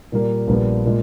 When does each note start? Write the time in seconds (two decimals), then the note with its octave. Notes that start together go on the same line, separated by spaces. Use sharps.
0.12 A#2 G3 A#3
0.47 A#1 A#2 G3 B3
0.86 A#2 G#3